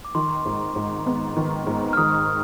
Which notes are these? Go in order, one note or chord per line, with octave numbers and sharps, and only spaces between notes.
D6
D#3 C6
G#2
G#2
B3
D#3
G#2
F6
D#3 D#6